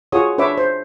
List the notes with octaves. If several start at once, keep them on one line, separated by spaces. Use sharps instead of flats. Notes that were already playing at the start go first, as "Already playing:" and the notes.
F4 F#4 G#4 C#5 D#6
D4 B4 C#5 E5 D6
C5